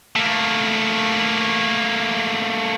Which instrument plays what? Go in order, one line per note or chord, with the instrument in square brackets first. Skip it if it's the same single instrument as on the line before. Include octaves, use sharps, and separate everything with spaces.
[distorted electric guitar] A3 A#3